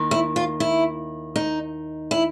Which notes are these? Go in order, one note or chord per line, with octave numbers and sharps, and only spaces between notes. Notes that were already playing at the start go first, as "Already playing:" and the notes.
Already playing: D#2 D#3
E4
F4
E4
D#4
E4